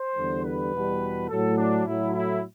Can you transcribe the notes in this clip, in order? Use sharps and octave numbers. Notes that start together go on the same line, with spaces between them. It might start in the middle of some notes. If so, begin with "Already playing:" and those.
Already playing: C5
E2 D3 G3
B4
E2 B2 G3
A2 F#3 A3 A4
D4
A2 F#3 A3 E4
E4